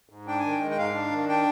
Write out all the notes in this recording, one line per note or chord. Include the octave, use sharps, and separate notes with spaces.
G#2
D4 G5
D#3 G#5
G5
G#3
G5
G#2 F5
D4
D#3
D4 G5